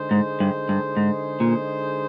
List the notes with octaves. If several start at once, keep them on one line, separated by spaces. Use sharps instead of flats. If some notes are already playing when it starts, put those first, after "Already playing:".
Already playing: D3 G#3 D#4 G#4 C5
G#2
G2
G2
G#2
A#2